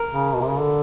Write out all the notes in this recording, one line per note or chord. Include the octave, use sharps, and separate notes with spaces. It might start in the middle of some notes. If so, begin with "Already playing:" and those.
Already playing: A#4
C#3
B2
C3
C#3
D3